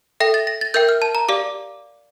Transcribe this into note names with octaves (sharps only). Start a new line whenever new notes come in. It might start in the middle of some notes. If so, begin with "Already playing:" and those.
A4 E5 G5 A#6
A6
A#6
A6
A#4 E5 G5 G6
F6
A5
A#5
G4 D5 F5 D6